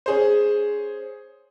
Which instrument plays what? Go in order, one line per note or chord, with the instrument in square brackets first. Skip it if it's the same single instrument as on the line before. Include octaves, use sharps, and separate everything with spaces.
[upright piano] C#4 G#4 C5